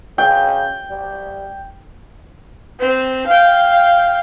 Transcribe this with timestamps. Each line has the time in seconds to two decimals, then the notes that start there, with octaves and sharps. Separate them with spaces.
0.18 C#3 G5
0.90 G3
2.80 C4
3.26 F5 G5